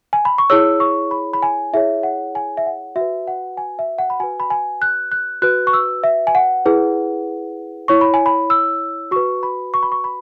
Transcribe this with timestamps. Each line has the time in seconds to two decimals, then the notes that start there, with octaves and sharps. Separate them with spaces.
0.13 G#5
0.25 B5
0.38 C#6
0.50 E4 G#4 C#5 E6
0.80 C#6
1.11 B5
1.33 B5
1.43 G#5
1.73 E4 G#4 C#5 E5
2.03 F#5
2.35 G#5
2.57 E5
2.66 F#5
2.96 F#4 E5
3.01 B4
3.28 F#5
3.57 G#5
3.79 E5
3.98 F#5
4.10 B5
4.20 F#4 B4 G#5
4.40 B5
4.50 G#5
4.82 F#6
5.12 F#6
5.42 F#4 B4 F#6
5.67 C#6
5.73 E6
6.03 E5
6.27 G#5
6.35 F#5
6.66 E4 G#4 B4
7.88 E4 C#5 C#6
8.01 B5
8.14 G#5
8.26 B5
8.50 E6
9.11 F#4 B4 C#6
9.43 B5
9.74 C#6
9.83 B5
9.92 C#6
10.04 B5